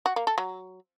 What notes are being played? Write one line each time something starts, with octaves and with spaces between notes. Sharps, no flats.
F#4
A#3
A4
F#3